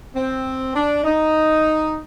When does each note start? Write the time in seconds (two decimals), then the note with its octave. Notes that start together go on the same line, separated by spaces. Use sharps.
0.15 C4
0.75 D4
1.04 D#4